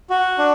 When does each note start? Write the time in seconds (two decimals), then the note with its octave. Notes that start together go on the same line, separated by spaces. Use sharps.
0.10 F#4
0.38 D4